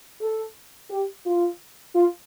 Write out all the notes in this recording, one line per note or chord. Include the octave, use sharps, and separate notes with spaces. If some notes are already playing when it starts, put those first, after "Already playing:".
A4
G4
F4
F4